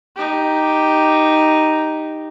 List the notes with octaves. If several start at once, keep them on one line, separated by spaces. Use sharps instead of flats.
D#4 G4